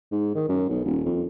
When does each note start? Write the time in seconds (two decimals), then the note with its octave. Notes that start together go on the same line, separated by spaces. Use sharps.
0.12 G#2
0.35 D#3
0.49 F#2
0.69 B1
0.85 D#1
1.06 F2